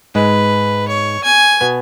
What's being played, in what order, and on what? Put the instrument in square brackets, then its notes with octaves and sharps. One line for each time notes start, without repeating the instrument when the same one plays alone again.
[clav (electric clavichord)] G#2 G#3 [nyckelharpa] B4
[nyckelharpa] C#5
G#5
[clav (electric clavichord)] B2 B3